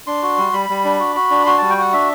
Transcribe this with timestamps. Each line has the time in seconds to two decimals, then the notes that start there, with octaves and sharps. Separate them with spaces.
0.07 D4 C6
0.22 F#4
0.38 G3
0.53 G3 B5
0.69 G3
0.85 D4
1.00 F#4
1.16 F#4
1.31 D4
1.46 F#4 C6
1.58 G3 A5
1.70 G5
1.77 F#4 F#5
1.93 D4 E5